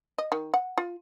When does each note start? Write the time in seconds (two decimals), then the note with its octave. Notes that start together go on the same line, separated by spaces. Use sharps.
0.18 D#5
0.32 D#3
0.54 F#5
0.78 F4